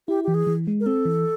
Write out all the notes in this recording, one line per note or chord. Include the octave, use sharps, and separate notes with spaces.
E4 G4
E3 G4
G#4
E3
G#3
A#4
C4 A4
E3